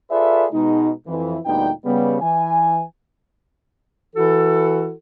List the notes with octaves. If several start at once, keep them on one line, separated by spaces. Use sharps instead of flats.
F4 G#4 A4 B4 D5 E5
B2 G#3 D#4
F2 E3
D2 A#2 G3 B3 D#4 G5
C#3 G3 B3
E3 G#5
E3 E4 F#4 A4